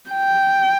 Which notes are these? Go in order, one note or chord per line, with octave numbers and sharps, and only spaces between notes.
G5